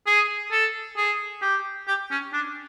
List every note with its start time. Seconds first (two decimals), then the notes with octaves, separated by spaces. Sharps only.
0.06 G#4
0.51 A4
0.97 G#4
1.42 G4
1.87 G4
2.11 C#4
2.33 D4